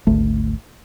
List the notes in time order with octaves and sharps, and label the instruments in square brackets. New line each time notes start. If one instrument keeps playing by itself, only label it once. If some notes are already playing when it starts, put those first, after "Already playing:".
[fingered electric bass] G#1 D2 A3